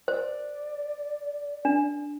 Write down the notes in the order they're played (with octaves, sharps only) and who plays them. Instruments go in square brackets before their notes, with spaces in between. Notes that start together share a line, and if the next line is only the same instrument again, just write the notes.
[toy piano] C5 [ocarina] D5
[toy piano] D4